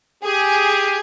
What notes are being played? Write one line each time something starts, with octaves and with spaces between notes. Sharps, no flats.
G4 G#4